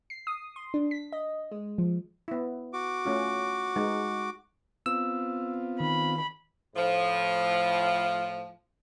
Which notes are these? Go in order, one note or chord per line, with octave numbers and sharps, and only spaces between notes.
C7
D#6
C6
D4
B6
D#5
G#3
F3
B3 E4
F#4 D6
A3 C#4 F4
G#3 D#4
B3 C4 F4 E6
D#3 B5
A2 F3